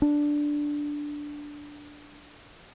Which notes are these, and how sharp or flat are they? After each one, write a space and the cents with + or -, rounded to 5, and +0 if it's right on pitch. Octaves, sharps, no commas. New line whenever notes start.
D4 +0